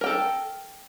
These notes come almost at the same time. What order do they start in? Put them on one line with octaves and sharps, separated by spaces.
A#4 G5 A4